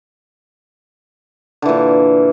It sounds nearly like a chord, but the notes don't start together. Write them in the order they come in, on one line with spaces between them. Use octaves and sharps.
D3 E3 A#2